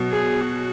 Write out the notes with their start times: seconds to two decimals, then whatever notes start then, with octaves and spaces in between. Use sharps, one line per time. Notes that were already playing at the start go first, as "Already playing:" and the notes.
Already playing: B2 F#3
0.11 G#4
0.41 F#4